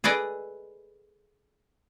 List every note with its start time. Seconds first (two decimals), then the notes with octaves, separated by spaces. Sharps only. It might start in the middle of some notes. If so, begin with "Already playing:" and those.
0.04 G#4 A4 B4 D5 D#5